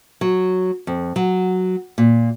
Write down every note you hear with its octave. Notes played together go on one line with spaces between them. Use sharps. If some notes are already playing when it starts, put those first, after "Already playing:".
F#3
F2
F#3
A#2